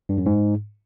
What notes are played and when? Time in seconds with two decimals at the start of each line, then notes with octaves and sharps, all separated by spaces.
0.09 G2
0.18 F#2
0.26 G#2